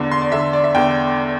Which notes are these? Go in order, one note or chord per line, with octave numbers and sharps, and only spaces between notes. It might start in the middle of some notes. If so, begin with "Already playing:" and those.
Already playing: E2 D3
C6
D5
E2 D3 E5
D5
E5
E2 D3 G5